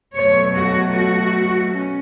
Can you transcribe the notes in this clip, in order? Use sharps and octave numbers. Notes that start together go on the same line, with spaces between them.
B2 F#3 A3 C#5
F#4
F#4
C#4